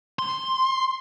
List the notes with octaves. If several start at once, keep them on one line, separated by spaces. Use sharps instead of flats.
C6